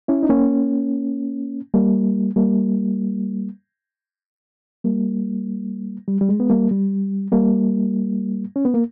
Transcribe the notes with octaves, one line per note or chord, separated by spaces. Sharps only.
C#4 E4
D#4
A#3 C#4
G3 A#3
G3 A#3
G3 A#3
G3
G3
G#3
B3
G3 A#3
G3
G3 A#3
C#4
B3
A#3